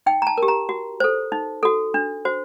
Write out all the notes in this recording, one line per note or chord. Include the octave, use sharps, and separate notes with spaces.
D#4 G5
A#5
A5
A#4
G4
A#5
F#4
A4 C5
D#4
F#4 A4
D4
F#4 C5